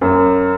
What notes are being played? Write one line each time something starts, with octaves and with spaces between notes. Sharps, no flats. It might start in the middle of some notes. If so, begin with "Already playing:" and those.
F#2